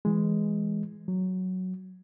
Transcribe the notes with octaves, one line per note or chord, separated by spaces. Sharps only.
E3 G#3
F#3